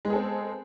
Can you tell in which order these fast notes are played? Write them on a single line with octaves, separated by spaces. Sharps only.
G#3 B3 G#4 A4 C4